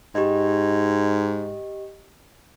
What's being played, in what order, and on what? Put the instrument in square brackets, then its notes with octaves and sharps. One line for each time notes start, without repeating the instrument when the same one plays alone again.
[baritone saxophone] G#2 [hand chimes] G4 D#5